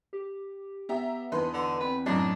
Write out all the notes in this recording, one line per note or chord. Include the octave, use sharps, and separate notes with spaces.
G4
B3 G4 E5 A#5
E2 D4 D#4 B4 C6
D3 A4
C4 B4
F#2 A2 D4 D#5 A#5